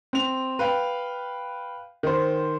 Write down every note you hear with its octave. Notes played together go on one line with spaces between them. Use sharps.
C4 F7
B4 F5 G5
D#3 C5